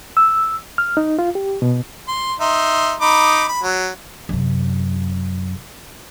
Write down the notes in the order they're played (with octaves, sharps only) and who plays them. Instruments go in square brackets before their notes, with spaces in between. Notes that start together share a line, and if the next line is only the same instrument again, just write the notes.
[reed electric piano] E6
F6
D#4
F4
G4
B2
[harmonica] C6
D#4 E5 C6
D#4 B5 D6
B5
F#3
[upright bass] F#2 C3